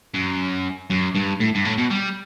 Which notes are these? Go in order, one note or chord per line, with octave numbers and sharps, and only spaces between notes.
F#2
F#2
G2
A2
G2
A2
B2
G3